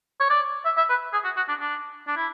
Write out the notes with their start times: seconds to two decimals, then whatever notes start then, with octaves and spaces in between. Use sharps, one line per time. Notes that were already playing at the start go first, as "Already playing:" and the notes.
0.20 C#5
0.30 D5
0.65 E5
0.77 E5
0.89 B4
1.13 G#4
1.24 F#4
1.36 F#4
1.49 D4
1.61 D4
2.08 D4
2.17 E4